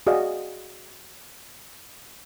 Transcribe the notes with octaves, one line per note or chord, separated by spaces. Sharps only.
F#4 G#4 D5 D#5 F5